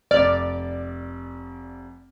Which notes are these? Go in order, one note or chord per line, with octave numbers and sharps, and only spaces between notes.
F1 D5 F6